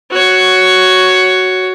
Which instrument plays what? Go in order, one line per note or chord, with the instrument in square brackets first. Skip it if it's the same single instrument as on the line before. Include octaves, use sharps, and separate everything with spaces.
[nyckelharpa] F#4 C#5